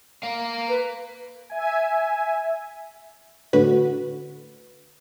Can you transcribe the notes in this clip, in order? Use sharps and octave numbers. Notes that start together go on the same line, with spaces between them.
A#4 F5
B4
E5 G#5
A2 D3 F#4 B4